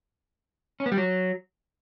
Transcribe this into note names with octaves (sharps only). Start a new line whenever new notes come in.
C#4
B3
G3
F#3